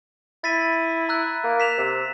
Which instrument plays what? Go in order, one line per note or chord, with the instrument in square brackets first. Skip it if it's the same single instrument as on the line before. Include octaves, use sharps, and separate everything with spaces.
[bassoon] E4 [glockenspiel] A6 B6 D#7
[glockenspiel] A#5 E6 F#6
[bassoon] A#3
[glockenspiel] B6 E7 F7
[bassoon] C3